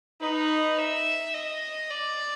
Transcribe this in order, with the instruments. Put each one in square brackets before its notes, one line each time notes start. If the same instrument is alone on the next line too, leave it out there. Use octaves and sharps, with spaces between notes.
[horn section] D#4 [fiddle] B4
[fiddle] B4
E5
D#5
D5